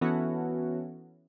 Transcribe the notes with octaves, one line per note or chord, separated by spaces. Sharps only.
E3 B3 C#4 E4 F#4 A4